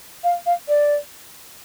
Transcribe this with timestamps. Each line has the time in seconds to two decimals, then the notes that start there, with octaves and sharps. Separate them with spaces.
0.24 F5
0.46 F5
0.68 D5